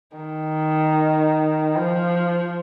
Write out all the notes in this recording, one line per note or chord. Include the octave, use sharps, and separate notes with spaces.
D#3
F3